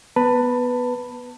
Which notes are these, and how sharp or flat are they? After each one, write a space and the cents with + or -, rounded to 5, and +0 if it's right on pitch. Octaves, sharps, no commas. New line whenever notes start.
B3 +0 B4 +0 A5 +25